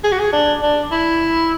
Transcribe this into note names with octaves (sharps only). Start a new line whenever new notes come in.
G#4
F#4
G#4
D4
D4
E4